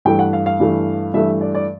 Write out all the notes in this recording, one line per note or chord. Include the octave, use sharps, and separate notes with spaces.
G2 E3 A3 G5
F#5
F5
F5
G2 E3 A3
G2 E3 A3 E5
D5
D5